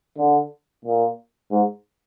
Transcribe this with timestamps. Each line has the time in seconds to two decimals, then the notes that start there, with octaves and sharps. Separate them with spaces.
0.18 D3
0.85 A#2
1.51 G#2